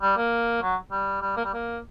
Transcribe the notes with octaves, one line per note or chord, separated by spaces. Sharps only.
G3
A#3
F#3
G3
G3
A#3
G3
A#3